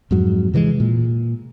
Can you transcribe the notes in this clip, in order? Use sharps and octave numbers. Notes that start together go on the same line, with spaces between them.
F2 G#2 F#3
C3 E3 G3 G#3
A#2